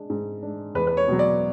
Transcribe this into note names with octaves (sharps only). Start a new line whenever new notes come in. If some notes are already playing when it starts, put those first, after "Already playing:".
Already playing: G#3 D4
G#2
G#3 D4
E2 B4
B4
C#5
B2 F#3
D5